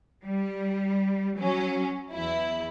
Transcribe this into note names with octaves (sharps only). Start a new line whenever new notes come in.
G3
F#3 C#4
E2 E4